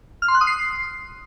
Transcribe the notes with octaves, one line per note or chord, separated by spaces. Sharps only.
F6
C6
F#6
D#6
C7